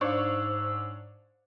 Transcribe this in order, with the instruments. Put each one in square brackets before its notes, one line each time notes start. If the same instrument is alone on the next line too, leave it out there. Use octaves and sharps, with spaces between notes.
[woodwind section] G#2 [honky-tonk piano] D4 C#5 C#6 [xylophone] C5 F5 [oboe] E6